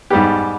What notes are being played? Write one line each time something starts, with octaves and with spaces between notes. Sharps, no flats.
G#2 G3 B3 G4